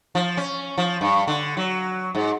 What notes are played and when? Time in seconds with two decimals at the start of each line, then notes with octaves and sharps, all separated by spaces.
0.15 F3
0.37 C#4
0.78 F3
1.01 G2
1.27 D3
1.57 F#3
2.15 G#2